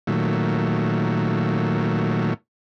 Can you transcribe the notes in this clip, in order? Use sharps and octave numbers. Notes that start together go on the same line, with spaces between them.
A#2 D#3 F#3 A3